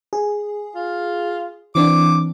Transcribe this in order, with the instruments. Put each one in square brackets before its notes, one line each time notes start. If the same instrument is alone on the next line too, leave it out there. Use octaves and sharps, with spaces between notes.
[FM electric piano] G#4
[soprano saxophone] F4
[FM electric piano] E3 C4 D4 [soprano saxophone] D6